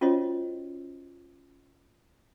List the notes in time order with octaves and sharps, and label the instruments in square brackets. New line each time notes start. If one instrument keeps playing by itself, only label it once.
[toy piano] C#4 F4 F#4 C5 C#5 D#5